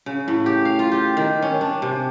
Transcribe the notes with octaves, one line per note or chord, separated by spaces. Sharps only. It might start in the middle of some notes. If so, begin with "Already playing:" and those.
C#3
A2
G4
F5
F4
G4
D#3
C#4
D4
C3